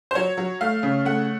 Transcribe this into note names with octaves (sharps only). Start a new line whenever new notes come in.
C5
F#3 C#5
F#3
A3 F5
C#3
A3 F#5